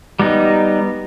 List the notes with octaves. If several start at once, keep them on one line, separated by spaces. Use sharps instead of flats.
G3 B3 D#4